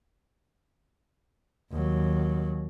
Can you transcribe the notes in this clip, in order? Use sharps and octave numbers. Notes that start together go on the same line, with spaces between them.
D#2 F#3